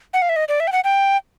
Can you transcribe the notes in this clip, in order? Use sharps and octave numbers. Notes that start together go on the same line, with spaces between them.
F#5
F5
E5
D#5
D5
E5
G5
F#5
G5